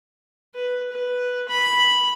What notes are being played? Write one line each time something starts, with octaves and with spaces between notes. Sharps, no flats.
B4
B4
B5